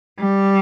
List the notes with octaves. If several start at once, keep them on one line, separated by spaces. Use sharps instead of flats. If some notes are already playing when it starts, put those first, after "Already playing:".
G3